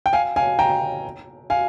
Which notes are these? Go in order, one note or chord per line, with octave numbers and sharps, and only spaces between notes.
G5
F5 G#5
F5 G#5
G5 A#5
F5 G#5